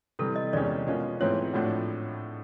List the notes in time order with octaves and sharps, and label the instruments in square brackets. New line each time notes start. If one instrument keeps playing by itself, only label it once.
[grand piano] C3 E3 G3 [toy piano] A4
[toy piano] D#5
[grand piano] E2 C3 D#3 G#3 C#4 [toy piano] D5
[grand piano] B2 G#3 C#4 F4
[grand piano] G#2 E3 A3 C4 F4 [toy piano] C#5
[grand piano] A2 F3 A3 D4 F#4